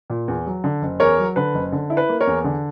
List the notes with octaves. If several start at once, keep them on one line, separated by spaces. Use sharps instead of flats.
A#2
E2
F#3
D3
F#1
E2 A#4 C#5
F#3
D3 B4
F#1
D3
E4
B4
A#3
A#4 C#5
E2
D3